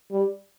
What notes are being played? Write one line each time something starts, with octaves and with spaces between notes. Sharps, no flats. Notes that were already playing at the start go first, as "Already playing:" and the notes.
G3